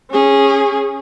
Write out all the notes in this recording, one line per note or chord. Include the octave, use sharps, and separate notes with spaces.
C#4 G#4